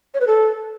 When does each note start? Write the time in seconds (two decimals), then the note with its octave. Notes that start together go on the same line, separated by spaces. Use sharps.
0.14 C#5
0.21 B4
0.27 A4